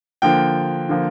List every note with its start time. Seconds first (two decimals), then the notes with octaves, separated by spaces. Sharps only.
0.22 D3 F3 A#3 G5
0.89 D3 F3 A#3